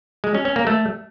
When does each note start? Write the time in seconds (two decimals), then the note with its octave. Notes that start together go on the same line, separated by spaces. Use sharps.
0.24 G#3
0.35 C#4
0.45 C#4
0.56 A#3
0.67 A3